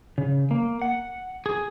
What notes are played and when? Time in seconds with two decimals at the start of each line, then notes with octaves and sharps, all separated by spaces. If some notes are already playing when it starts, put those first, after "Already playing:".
0.18 C#3
0.51 A#3
0.82 F#5
1.46 G#4